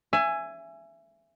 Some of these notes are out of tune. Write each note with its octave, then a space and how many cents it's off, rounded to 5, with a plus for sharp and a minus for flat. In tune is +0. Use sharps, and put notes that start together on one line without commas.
E5 +25 G#5 +0